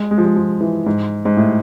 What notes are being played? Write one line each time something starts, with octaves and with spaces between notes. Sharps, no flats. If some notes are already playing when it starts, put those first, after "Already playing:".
Already playing: G#3
G#3
F3
G#3
F3
E3
G#2
G#2
A2